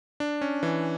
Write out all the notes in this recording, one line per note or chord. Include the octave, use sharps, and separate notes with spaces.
D4
C#4
E3